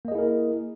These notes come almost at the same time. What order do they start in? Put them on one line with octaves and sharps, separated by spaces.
A#3 D#5 G#4 E4 A#4